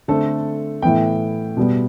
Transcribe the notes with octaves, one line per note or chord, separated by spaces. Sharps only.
D3 A3 C4 A4
A2 E3 B3 G5
B2 G3 B3